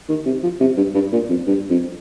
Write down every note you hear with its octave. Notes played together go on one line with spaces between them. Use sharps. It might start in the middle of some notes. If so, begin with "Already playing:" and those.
D#3
C3
F3
C3
G2
G2
A#2
F2
G2
F2